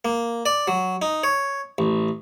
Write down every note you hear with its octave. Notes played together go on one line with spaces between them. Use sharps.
A#3
D5
F#3
D#4
C#5
A1